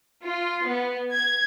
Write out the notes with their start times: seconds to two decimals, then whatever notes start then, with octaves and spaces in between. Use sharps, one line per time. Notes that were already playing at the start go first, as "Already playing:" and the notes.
0.24 F4
0.65 B3
1.12 G#6